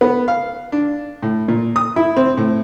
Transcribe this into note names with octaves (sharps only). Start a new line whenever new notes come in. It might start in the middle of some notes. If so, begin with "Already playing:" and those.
B3
F5
D4
A2
A#2
D#6
E4
C4
A2